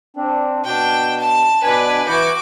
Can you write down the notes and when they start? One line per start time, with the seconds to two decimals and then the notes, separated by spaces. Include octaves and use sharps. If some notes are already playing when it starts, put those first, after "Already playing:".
0.17 C4 D4
0.64 B2 D4 G5
1.20 A5
1.63 B2 D4 B4 D5 G#5
2.08 E3 E4 F#4 D6 G6